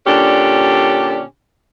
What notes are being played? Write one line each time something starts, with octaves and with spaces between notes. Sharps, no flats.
A#2 D3 C#4 D4 G4